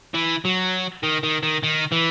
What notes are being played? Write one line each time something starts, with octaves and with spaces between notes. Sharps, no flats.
E3
F#3
D#3
D#3
D#3
D#3
E3